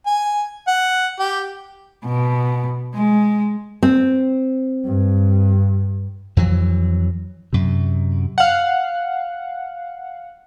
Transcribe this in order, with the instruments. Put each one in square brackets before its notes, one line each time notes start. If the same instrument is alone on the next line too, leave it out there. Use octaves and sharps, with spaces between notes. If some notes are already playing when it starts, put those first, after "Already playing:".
[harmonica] G#5
F#5
G4
[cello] B2
G#3
[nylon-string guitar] C4
[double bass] G2
[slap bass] F2 E3 F#3
F#2 C3
[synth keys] F5 F#5